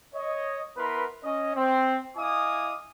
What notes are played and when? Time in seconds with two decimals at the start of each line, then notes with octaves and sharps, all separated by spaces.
0.14 C#5 D#5
0.77 B3 E4 A#4 B4 B5 C6
1.23 C#4 D#5
1.55 C4
2.17 E4 D#5 F5 G#5 D6 D#6